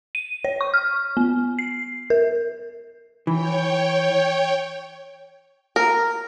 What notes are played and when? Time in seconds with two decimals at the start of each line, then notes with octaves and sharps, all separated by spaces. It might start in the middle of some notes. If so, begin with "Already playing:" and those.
0.15 D#7
0.44 C#5
0.61 C#6
0.74 F6
1.17 B3
1.59 C7
2.10 A#4
3.27 E3 C#5 G5
5.76 A#4